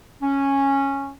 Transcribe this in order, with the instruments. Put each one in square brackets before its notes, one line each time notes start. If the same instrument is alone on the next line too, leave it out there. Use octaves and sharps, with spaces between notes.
[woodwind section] C#4